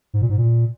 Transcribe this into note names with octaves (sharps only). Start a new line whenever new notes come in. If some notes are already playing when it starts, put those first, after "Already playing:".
G#2
A#2
G#2
A#2